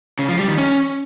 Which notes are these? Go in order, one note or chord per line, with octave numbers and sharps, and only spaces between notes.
C#3
F3
G3
D#3
C#4